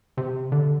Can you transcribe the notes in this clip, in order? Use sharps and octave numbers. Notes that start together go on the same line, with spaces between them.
C3
D3